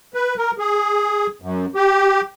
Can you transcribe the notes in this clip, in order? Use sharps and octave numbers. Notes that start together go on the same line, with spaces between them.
B4
A#4
G#4
F#2
G4